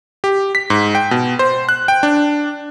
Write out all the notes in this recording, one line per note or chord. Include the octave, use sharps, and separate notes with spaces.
G4
B6
G#2
G5
B2
C5
F#6
G5
D4